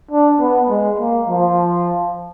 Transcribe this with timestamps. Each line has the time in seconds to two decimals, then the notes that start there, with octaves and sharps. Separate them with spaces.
0.11 D4
0.40 B3
0.69 G#3
0.99 A#3
1.29 F3